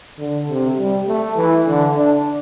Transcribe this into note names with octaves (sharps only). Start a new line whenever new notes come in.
D3
C3
G3
A3
E3
D3
D4